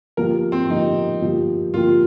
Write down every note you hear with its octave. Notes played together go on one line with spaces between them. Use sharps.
F3 A#3 G4 A#4
C4
F3 A#3 D#4 G4
F3 A#3 G4
F3 A#3 F4 G4